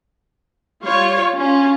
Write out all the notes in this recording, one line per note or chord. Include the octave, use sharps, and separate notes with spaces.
G3 F4 C#5
C#4 F4